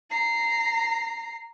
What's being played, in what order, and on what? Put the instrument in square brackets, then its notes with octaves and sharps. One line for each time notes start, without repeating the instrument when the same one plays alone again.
[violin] A#5 C7